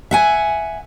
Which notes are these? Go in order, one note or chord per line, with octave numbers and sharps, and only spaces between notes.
E5 F#5 G#5